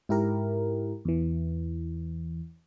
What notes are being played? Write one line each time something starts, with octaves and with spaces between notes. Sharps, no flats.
G#2 E4 G4 A#4
E2 E3